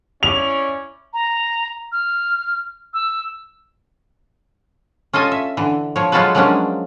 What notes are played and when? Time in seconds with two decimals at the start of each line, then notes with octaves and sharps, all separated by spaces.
0.23 C#4 E4 D5 F7
1.13 A#5
1.92 F6
2.94 E6
5.13 C#4 F4 A4 D#5 G#5
5.32 E5
5.57 D3 E3
5.96 F3 C#5
6.12 F#3 G#3 F4 F#4 A4 B4
6.35 F3 F#3 G#3 A#3 C#4 D4